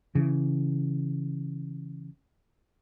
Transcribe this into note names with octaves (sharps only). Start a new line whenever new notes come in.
C#3 E3